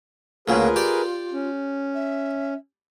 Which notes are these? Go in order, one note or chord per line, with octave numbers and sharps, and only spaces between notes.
D2 A#2 C#3 F4 G#4 A#4 B4
G4 D5
C#4
E5